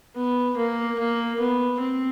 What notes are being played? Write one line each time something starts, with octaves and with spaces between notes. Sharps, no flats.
B3
A#3
A#3
B3
C4